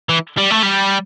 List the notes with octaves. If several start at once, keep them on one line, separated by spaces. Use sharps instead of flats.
E3
G3
A3
G3